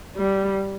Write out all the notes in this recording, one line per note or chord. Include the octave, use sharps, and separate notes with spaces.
G3